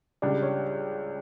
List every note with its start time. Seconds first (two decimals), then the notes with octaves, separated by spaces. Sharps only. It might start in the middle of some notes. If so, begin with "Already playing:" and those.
0.22 C#2 C#3 G3 D4 D5
0.43 C#5